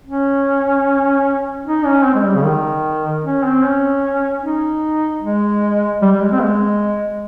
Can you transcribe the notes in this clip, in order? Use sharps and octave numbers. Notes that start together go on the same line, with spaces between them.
C#4
D#4
C#4
C4
G#3
G3
C#3
D#3
C#4
C4
C#4
D#4
G#3
G3
G3
G#3
C4
G#3